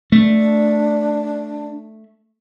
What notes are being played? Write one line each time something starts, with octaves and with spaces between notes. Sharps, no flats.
A3 D4